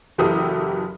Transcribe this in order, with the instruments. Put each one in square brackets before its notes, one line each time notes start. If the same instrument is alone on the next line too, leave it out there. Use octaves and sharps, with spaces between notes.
[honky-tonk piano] F#1 E3 F#3 G4 A4 D#6